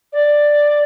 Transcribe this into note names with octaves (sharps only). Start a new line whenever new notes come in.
D5